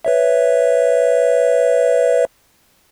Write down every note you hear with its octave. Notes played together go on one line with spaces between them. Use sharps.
B4 C#5 E5